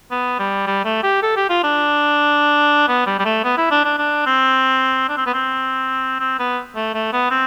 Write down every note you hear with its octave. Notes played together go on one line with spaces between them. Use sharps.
B3
G3
G3
A3
G4
A4
G4
F4
D4
B3
G3
G3
A3
B3
E4
D4
D4
D4
C4
D4
C4
B3
C4
C4
B3
A3
A3
B3
C4